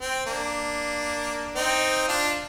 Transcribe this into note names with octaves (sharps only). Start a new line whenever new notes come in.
C4
A#3 D4
C4 D#4
D4 F4